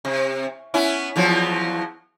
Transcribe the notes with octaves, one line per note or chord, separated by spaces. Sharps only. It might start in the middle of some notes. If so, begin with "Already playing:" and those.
C3
B3 C#4 E4
E2 F3 F#3